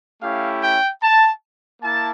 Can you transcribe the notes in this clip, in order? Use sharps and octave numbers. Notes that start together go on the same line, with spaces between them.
A3 C#4 E4 G4 F5
G5
A5
A#3 E4 A5